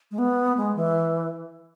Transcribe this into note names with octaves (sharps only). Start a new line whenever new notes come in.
G#3
B3
G#3
E3